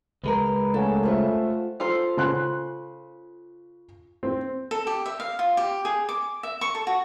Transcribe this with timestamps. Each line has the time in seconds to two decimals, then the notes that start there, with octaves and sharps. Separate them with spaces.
0.24 C#2 G#3 A#4 B4
0.74 C#3 A3 A4 F#5 G#5
1.03 A3 F4 C5 E5 F#5
1.80 F4 A4 C5
2.17 C#3 C6 F#6
4.23 C4
4.71 A4
4.87 G4
5.06 E5
5.20 F5
5.39 F4
5.57 G4
5.85 G#4
6.09 D6
6.43 E5
6.61 C#6
6.75 A4
6.87 F#4